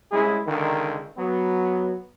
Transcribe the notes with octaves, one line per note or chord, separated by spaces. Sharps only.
C2 G#3 C#4 E4 G#4
C#2 D3 D#3
F#3 B3